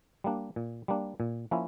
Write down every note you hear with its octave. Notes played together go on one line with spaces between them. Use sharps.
G3 A#3 D4
A#2
G3 A#3 D4
A#2
F3 A#3 C#4 E4